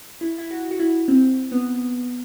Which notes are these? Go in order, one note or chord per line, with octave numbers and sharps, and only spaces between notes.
E4
E4
F#4
F#4
E4
C4
B3